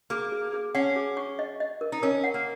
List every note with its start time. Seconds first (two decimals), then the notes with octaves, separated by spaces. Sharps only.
0.10 A#3 G#4
0.32 G#4
0.53 G#4
0.75 C#4 F#5
0.96 G#4
1.17 C#6
1.39 D#5
1.60 D#5
1.81 A#4
1.92 D#4
2.03 C#4 A#4
2.24 F#5
2.34 A#3